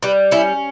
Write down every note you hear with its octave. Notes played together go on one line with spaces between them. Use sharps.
G3 B4
C#4 E4